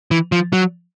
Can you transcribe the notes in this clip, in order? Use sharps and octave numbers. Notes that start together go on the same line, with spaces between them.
E3
F3
F#3